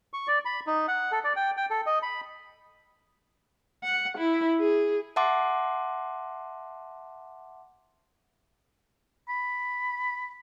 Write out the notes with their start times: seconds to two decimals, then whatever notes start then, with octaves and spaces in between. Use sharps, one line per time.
0.13 C#6
0.27 D5
0.45 B5
0.67 D#4
0.88 F#5
1.12 A4
1.24 D5
1.36 G5
1.57 G5
1.70 A4
1.86 D#5
2.03 B5
3.83 F#5
4.18 E4
4.60 G#4
5.16 E5 F#5 A5 C6 D6
9.29 B5